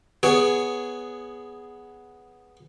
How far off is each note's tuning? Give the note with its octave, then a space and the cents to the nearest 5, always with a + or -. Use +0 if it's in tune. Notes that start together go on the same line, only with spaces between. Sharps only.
B3 +0 G#4 +0 C#5 +15